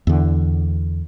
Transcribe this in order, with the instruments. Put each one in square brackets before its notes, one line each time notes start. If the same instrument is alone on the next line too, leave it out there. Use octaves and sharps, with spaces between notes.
[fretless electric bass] E2 D3